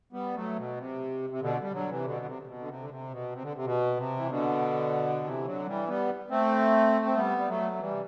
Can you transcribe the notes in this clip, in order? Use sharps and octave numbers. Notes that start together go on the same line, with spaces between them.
G3 B3
F#3 A3
B2
C3
C3
B2 D3
G3
D3 F#3
C3 E3
B2 D3
C3
C3
B2
D3
C3
D3
C3
B2
C3
D3
C3
B2
C3
E3
B2 D3
C3 E3
D3 F#3
E3 G3
G3 B3
A3 C4
C4
G3 B3
G3
F#3 A3
A3
E3 G3
C3